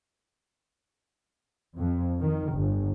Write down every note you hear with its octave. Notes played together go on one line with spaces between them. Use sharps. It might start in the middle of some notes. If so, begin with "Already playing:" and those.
F2
D#3
G1